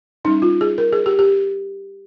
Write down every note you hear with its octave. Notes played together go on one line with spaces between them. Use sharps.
G3 C#4 D#4
F4
G#4
A#4
G#4
G4
G4